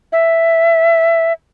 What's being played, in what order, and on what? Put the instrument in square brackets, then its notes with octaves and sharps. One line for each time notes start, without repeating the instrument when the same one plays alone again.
[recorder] E5